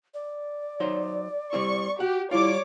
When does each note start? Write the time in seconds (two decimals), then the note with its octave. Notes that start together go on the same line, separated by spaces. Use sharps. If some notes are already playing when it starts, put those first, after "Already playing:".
0.14 D5
0.80 F#3 D#4 C5
1.53 G3 C4 E4 C#6
2.00 F#4 G4 F#5
2.31 G3 E4 F4 C#5 D5 D6